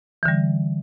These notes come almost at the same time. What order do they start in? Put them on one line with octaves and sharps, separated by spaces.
E3 D3 G3